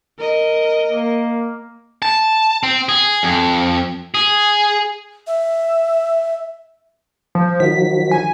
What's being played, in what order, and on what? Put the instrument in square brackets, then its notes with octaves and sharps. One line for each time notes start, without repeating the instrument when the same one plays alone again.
[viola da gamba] A#4 D#5
[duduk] A#3
[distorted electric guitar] A5
C4
G#4
F2
G#4
[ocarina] E5
[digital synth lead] F3
[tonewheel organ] D#3 F3 F#3 [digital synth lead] B6
[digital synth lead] G#5